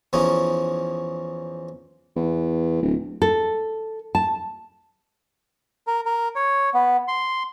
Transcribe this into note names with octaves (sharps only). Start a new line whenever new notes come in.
E2 F3 C#4 D#4
E2
D1
A4
A5
A#4
A#4
C#5
B3
C6